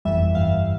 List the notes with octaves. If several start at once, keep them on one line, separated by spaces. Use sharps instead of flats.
G1 F2 E3 G3 E5
G1 G2 E3 G3 F5